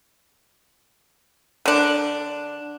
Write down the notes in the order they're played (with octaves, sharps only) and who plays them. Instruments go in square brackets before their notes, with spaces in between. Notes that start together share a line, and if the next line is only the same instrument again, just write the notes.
[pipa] D3 D4